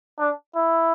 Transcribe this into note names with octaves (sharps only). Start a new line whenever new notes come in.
D4
E4